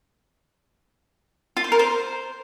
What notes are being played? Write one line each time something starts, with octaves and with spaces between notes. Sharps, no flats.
F4
C5
A#4
C5